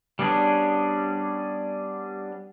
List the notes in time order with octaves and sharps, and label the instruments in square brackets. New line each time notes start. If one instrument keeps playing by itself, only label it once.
[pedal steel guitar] G3 B3 C#4 D4 G#4